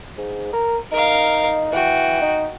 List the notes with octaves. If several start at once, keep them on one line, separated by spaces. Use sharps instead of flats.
G#2
A#4
D#4 A#4 F5
E3 F#4 G5
D#4